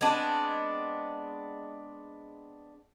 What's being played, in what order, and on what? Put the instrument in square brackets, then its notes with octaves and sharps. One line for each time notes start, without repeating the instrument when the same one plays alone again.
[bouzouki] G#3 B3 C4 D4